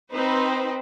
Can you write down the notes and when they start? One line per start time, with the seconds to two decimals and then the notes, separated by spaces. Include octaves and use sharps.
0.13 C4 D#4 B4 C5